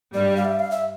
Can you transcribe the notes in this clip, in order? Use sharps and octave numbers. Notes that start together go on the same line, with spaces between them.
G2 G3 D5
F5
E5
F5
E5